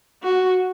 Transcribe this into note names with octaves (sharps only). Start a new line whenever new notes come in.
F#4